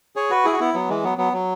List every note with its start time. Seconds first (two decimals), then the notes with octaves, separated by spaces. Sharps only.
0.16 G#4 C#5
0.30 F#4 B4
0.45 E4 G#4
0.53 F#4
0.60 B3 E4
0.74 F#3 B3
0.89 E3 G#3
1.04 F#3 B3
1.18 F#3 B3
1.33 F#3